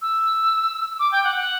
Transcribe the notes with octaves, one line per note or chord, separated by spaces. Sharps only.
E6
D6
G5
F#5
F#5